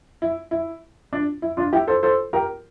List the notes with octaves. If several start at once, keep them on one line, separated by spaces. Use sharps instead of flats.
E4
E4
D4
E4
D4 F4
E4 G4
A4 C5
A4 C5
G4 A#4